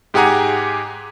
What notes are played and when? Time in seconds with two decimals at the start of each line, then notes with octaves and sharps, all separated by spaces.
0.14 G#2 G4 G#4 F#5 G#5 A#5